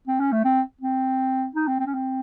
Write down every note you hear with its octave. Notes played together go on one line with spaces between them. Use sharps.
C4
C#4
A3
C4
C4
D#4
C4
C4
C#4
C4